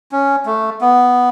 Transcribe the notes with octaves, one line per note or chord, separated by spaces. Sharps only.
C#4
A3
B3